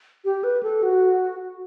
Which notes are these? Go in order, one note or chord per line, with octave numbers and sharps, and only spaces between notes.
G4
B4
A4
F#4